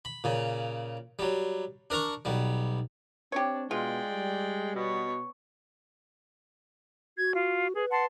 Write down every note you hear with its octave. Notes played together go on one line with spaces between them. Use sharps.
B5
A#2 C#3
F#3 G3
D4 A#4 A#5 C#6
B1 G3
C4 D4 G4 C#5
B2 G#3 F4 D5 G5
G3
B2 B3 C#5
F#4 G#6
F4
G#4 B4
F#5 A5 C6